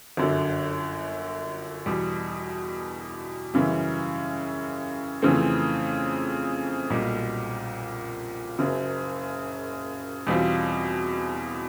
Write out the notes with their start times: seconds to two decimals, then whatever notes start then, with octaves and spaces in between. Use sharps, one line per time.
0.17 G1 F#2 D3
1.86 E2 B2 G3
3.54 F#2 C#3 E3 G3
5.22 F2 C#3 E3 A3 C4
6.90 B1 A#2 G3
8.59 F#1 F#2 C#3
10.27 E2 B2 G3 C4 F4